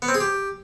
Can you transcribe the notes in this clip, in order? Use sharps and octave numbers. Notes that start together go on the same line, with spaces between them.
B3
C4
G#4
G4